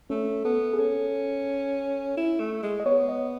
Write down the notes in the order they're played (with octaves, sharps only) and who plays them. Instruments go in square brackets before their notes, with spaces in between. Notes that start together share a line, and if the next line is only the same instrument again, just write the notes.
[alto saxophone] A3 [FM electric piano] C#4
[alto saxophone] B3 [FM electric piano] A4
[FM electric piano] G#4
[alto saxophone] C#4 [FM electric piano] A4
[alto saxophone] E4
A3
G#3
[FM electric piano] D#5
[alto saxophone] B3 [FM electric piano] C#5
[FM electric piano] D#5